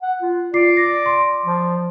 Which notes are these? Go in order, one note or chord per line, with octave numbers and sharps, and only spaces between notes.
F#5
F4
F4 D5 D6 C7
A#6
C6
F3